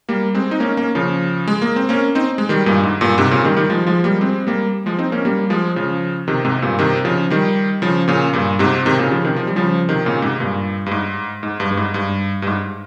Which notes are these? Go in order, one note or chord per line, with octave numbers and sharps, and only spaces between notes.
G3 A#3
G#3 C4
D#4
A#3 C#4
A#3 C#4
C#3 F3
G#3
A#3
C4
A#3 C#4
C4 D#4
G#3
D#3 G3
G2 A#2
G#2
G2 A#2
G#2 C3
A#2 C#3
D#3 G3
D#3 G3
F3 G#3
F3 G#3
G3 A#3
G#3 C4
G3 A#3
F3 G#3
C4 D#4
A#3 C#4
G3 A#3
F3 G#3
C#3 F3
C3 D#3
G#2 C3
G2 A#2
C3 D#3
C#3 F3
D#3 G3
C#3 F3
A#2 C#3
G2 A#2
G#2 C3
C3 D#3
A#2 C#3
C#3 F3
C3 D#3
F3
G3
C#3 F3
C3 D#3
A#2 C#3
G#2 C3
G2 A#2
G2
G#2
G#2
G2
G2
G#2
G2
G2
G#2